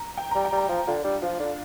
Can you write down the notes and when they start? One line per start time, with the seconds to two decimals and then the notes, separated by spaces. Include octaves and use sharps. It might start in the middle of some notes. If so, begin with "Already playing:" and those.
Already playing: A#5
0.17 G5
0.31 G3 A#5
0.45 G5
0.52 G3
0.57 A#5
0.69 F3 G5
0.87 D3 F4
1.04 G3 D4
1.22 F3 F4
1.40 D3 D4